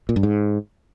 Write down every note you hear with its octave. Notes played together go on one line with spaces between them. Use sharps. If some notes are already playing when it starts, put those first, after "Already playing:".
A#2
G2
G#2